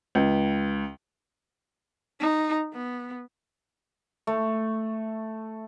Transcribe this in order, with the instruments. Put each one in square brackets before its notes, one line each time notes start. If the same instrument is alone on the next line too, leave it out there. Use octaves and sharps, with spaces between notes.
[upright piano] C#2
[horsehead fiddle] D#4
B3
[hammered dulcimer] A3